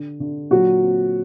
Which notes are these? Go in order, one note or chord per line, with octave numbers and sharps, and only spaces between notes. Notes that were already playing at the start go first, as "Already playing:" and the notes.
Already playing: D3
D3
A#2 F#3 F#4
C4